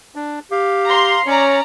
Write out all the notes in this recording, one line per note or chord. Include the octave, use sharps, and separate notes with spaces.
D4
G4 F5
A#5 C6
C#4 C#5 D5 A#5